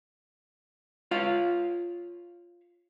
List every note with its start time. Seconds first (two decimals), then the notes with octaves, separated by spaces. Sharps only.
1.11 F4 C#5 F5